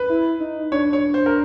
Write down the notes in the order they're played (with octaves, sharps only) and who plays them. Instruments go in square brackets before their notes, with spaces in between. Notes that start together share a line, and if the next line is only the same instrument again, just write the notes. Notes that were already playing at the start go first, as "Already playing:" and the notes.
Already playing: [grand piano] B4
[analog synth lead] E4
D#4
[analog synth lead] D4 [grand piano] C#5
[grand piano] C#5
C5
A#4